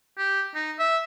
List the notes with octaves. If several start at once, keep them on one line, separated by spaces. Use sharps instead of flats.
G4
D#4
E5